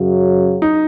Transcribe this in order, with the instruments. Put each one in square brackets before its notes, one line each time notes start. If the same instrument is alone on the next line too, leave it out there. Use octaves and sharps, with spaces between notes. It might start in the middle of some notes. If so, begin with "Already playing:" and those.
Already playing: [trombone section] F#2 C#3 F#3
[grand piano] D#4